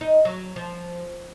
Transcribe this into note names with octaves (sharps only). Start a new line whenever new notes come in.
D#4
F#3
F3